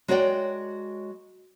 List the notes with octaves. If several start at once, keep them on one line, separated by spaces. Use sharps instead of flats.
G#3 F#4 A#4 C#5 D5 G5